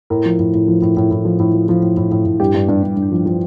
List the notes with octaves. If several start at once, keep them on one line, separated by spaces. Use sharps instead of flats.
A2 A#4
F3
A2
A2
F3
A2
A2
A2
F3
A2
F3
F3
A2
A2
A2
A2
G2 G4
G2
G2
G2
G2
F3
F3